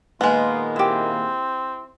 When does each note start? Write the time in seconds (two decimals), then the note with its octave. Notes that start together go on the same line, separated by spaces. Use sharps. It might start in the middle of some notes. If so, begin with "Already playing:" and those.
0.21 A#2 D#3 G#3 A#3 B3 F4
0.76 C4 E4 G4